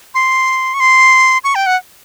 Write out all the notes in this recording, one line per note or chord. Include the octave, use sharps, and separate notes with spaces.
C6
C#6
C6
C#6
G5
F#5